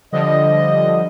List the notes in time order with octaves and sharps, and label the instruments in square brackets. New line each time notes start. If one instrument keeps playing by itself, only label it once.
[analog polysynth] D3 F3 G3 [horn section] D#5